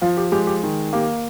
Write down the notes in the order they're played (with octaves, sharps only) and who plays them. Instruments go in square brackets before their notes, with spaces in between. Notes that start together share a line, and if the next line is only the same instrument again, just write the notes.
[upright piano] F3 F4
G4
G#3 G4
G4
D#3
A#3 G4